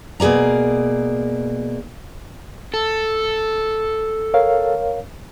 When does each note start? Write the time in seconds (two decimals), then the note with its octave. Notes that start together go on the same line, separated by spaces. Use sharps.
0.20 B2 A#3 G#4 D5 A#5
2.74 A4
4.34 A#4 C#5 F5